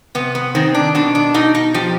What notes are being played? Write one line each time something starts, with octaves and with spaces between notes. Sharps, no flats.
C3 B3
B3
D#3 C4
D4
B2 D4
D4
B2 D#4
D#4
F3 G4